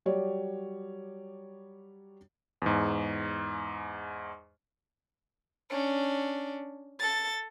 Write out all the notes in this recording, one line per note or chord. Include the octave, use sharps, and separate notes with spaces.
F#3 G3 G4 C#5 D5
E2 G#2
C#4 D4
A4 A6